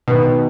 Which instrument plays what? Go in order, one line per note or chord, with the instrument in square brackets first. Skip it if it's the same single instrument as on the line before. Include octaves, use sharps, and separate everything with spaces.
[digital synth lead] B2 [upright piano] D#3 B3 D#4